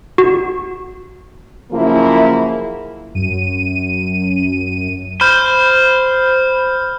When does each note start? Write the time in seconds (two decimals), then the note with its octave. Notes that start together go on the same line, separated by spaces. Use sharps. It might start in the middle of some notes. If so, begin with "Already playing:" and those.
0.18 F#4
1.72 F#2 C#3 F3 A#3 E4
3.14 F#2 D#7
5.21 C5 B5 F6 G6